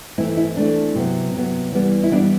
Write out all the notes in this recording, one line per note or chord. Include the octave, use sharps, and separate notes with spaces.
E3 A3 C4 E4
E4
E3 A3 C4 D4
C3 F#3 B3
C3 F#3 B3
E3 G3 B3
E4
E3 G3 B3 D4